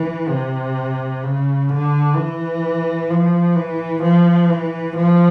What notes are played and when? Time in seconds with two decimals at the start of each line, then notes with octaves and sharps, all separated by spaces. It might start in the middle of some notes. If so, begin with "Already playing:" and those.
Already playing: E3
0.29 C3
1.23 C#3
1.69 D3
2.16 E3
3.10 F3
3.56 E3
4.03 F3
4.50 E3
4.97 F3